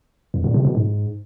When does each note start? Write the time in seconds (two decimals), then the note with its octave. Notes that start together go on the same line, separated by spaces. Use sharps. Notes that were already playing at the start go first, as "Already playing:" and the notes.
0.34 F2
0.44 A#2
0.54 C3
0.65 B2
0.75 G#2